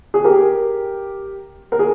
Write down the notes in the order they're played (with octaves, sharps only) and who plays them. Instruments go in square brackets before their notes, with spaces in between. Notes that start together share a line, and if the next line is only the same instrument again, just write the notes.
[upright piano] G#4
G4 A#4
A#4
G#4